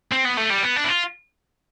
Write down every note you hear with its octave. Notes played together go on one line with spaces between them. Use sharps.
C4
B3
A3
G3
B3
D4
E4
F4